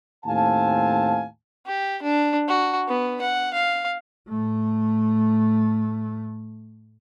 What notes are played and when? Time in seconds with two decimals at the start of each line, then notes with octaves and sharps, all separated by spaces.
0.25 D#2 A2 C4 F5 G#5 A5
1.67 G4
2.03 D4
2.48 F#4
2.88 B3
3.22 F#5
3.54 F5
4.29 A2 A3